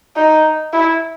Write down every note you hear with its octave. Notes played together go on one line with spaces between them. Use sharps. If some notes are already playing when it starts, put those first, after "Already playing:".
D#4
E4